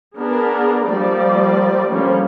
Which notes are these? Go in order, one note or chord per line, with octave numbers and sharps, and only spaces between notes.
B3 D4 G#4 A#4
F3 G3 A3 A#3 D5
D3 F3 G3 A#3 C#4